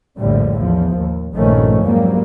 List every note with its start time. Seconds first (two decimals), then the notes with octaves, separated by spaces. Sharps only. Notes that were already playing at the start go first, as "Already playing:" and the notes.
0.19 A#1 F2 A2 D3 G3
0.60 E2 F3
0.97 D#2
1.34 A#1 G2 D#3 F3 A3 C#4
1.83 F2 G#2 F#3 G3 A#3